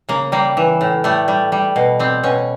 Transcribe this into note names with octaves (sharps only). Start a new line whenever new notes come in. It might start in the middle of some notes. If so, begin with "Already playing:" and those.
C#3 A#3
G3 A#3
E3
A2
G3 A3
G3
G3
B2
G3 C4
B2 C#4